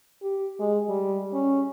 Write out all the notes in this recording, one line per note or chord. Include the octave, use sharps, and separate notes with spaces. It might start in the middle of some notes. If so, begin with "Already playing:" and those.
G4
G#3
G3
C#4